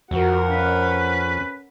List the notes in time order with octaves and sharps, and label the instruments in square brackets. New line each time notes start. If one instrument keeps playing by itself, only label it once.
[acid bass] F2 [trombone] F#4 [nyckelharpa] A#4 F#5
[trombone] C#4 [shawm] B4